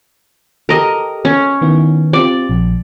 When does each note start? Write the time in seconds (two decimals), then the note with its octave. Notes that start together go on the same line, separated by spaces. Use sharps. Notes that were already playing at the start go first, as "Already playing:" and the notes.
0.69 G4 A4 A#4 D#5
1.25 C#4
1.61 D#3 B3 E4
2.13 C4 F4 G4 D5
2.49 A#1